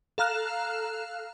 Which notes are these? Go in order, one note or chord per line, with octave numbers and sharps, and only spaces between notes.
A4 F5 A#5 F6 F#6 E7